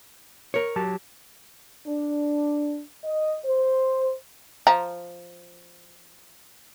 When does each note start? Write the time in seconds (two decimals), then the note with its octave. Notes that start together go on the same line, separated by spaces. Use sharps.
0.54 A#4 C#5
0.76 F#3 G4 A5
1.86 D4
3.04 D#5
3.44 C5
4.67 F3 A#5